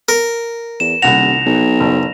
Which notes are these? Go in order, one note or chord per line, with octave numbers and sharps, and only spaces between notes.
A#4
E2 E7
D#1 C2 F#5 A#6 F7
B1
F#1